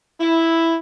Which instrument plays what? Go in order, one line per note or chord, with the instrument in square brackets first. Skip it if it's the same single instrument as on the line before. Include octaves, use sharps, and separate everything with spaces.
[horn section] E4